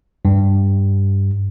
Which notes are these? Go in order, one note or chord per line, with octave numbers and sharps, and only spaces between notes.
G2